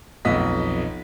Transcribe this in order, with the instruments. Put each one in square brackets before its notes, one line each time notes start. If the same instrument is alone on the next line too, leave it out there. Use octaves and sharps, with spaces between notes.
[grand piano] B1 F2 B3 D#5 B6